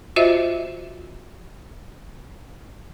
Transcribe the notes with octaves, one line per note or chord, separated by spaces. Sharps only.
F4 F#4 C5 D#5 E5